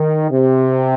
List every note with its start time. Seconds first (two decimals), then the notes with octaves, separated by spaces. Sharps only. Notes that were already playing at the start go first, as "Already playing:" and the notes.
Already playing: D#3
0.30 C3